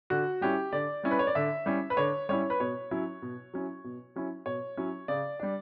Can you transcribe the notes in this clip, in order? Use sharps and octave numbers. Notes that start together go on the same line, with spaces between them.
D3 F#4
G3 C#4 E4 G4
D3 D5
G3 C#4 E4
B4
C#5
D5
D3 E5
G3 C#4 E4
B4
D3 C#5
G3 C#4 E4 C#5
B4
B2 C#5
F#3 C#4 E4
B2
F#3 C#4 E4
B2
F#3 C#4 E4
B2 C#5
F#3 C#4 E4
C#3 D5
G3 D4